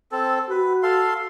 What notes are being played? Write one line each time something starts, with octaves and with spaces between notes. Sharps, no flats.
C4 A4
F#4 B4
A4 F5 C6